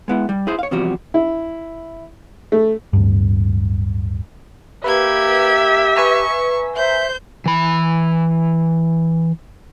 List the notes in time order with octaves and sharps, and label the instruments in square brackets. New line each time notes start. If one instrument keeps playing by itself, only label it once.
[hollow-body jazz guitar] G#3 B3 E4
G3
E4 G#4 C5
C#5 F5
E2 C3 F3 G3 F#4
[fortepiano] E4
A3
[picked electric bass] D1 G2
[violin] A#3 G#6 [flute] G4 [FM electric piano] B4 [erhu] E5
[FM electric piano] B4 G#5 A#5 [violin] C#6
[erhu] C5 [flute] E5 [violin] G6
[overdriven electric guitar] E3 B5